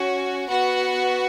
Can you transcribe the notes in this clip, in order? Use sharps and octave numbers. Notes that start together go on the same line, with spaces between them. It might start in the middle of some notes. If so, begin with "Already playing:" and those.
Already playing: C#4 F#4
B3 F#4 F#5